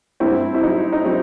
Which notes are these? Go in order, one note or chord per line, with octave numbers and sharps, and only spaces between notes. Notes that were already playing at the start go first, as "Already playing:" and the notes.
G2 C4 E4
E4
F#3 D#4
D#4
F#3 C4